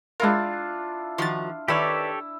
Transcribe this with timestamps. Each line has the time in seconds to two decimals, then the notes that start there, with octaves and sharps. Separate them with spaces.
0.20 G#3 D4 E4 F4 A#4
1.18 D#3 F3 F#4 C6 A6
1.68 D#3 E4 G4 A4 B4 C#5 D5